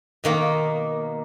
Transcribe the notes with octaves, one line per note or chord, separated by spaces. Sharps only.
B2 D#3 A#3